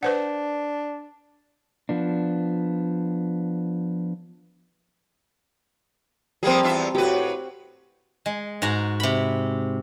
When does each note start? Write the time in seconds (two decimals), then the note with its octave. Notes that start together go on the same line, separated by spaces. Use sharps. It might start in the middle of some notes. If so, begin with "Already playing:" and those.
0.03 D4 B4 C5 F#5
1.89 F3 B3 D4
6.43 F3 G3 A#3 C4 G#4
6.63 E2 F4 E5
6.95 A2 F#4 G4 B4
8.26 G#3
8.62 G#2 F#4 A#5
9.00 C3 B5